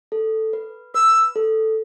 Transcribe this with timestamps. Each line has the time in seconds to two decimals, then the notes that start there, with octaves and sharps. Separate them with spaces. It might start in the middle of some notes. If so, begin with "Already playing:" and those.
0.12 A4
0.53 B4
0.94 B4 E6
1.36 A4